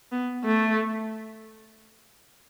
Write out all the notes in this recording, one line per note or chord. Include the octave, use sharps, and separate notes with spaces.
B3
A3